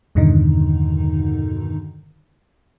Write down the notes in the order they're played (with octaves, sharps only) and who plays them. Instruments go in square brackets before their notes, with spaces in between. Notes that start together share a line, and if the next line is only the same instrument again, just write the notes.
[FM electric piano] E2 G2 B2 D3 D#3 D#4